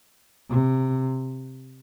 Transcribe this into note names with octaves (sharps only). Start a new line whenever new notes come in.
C3